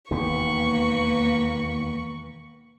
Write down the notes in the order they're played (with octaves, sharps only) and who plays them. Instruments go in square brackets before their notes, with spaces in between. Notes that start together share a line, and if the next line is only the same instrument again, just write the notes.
[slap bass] E1 D#2 B2 [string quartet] A#3 B4 C#6